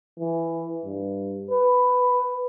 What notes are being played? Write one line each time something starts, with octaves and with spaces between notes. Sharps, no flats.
E3
G2
B4